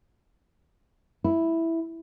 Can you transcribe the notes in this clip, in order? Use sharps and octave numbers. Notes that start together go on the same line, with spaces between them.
E4